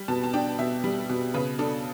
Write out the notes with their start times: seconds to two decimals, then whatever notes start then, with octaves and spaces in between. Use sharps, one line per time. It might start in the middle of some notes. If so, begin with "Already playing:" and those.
Already playing: G3
0.08 B2 A5
0.24 A5
0.33 D4 G5
0.59 B2 E5
0.84 G3
1.09 B2
1.34 C#3 B4
1.59 D4 A4